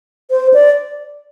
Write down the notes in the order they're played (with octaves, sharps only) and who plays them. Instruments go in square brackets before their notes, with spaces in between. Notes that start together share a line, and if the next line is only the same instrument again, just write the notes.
[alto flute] C5
D5